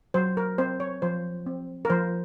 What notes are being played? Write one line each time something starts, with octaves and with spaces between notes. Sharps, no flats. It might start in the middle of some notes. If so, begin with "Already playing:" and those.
F#3 C5
A#4
C4 C5
C#5
F3 C5
C4
A#4
F3 C5